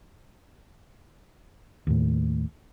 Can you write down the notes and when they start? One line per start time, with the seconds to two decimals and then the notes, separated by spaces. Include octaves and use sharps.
1.87 D#2 A2